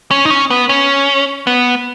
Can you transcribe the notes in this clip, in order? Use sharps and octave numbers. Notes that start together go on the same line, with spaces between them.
C#4
D#4
C#4
B3
C#4
B3